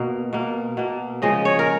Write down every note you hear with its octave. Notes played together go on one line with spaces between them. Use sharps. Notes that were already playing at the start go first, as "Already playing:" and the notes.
Already playing: B2 A#3
B2 A#3
B2 A#3
C#3 F3 G#3 D#5
C#5
A#4